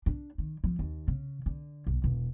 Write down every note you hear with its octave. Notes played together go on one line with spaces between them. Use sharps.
D4
D#3
F3
D#2
C#3
D3
B1
E1